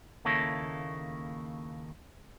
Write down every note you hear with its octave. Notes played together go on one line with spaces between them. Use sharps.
D#2 C#3 A#3 E4 A4 C#5